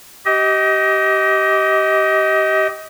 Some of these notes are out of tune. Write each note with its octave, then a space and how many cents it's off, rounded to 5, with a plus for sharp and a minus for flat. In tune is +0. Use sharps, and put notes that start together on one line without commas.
G4 -20 D#5 +20